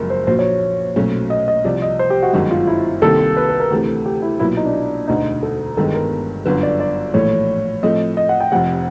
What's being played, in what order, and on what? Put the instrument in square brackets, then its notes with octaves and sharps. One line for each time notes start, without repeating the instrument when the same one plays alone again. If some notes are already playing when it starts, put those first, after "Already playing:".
Already playing: [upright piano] F#1 F#2 C#3 F3 G#3 [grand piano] A#4
[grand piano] C5
[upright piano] A#1 A#2 F#3 [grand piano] C5
[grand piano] C#5
[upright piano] B1 A#2 F#3 A3 C#4
[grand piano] D#5
D#5
[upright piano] C2 C3 F3 [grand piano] D5
[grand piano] D#5
C5
G4
F#4
[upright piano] G1 F#2 D#3 G#3 [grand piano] F#4
[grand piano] F4
E4
[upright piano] C2 C3 D#3 G3 A#3 [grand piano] A4
[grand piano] B4
B4
A#4
[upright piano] D2 C3 E3 A3
[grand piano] G4
E4
[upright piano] B1 A#2 F#3 B3 [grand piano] E4
[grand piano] D#4
D4
[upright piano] E1 D2 D3 [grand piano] D#4
[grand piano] A4
[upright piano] G1 G2 D#3 G#3 B3 [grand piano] A4
[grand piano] A#4
[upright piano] G1 F#2 D3 [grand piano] B4
[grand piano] D5
D5
[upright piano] A#1 A2 E3 A3 [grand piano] C#5
[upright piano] A2 F3 A3 C4 [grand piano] D#5
[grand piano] D#5
F#5
G5
[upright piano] F1 F2 C3 [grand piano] F#5